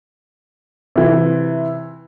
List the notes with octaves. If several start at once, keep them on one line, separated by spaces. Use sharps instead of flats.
C3 E3